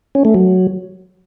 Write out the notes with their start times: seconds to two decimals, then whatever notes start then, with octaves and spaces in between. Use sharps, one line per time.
0.15 C#4
0.25 A3
0.34 F#3